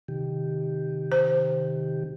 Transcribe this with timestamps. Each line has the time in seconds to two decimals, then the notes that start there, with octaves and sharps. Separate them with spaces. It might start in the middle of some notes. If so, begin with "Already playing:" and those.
0.08 C3 D#3 G4
1.12 C5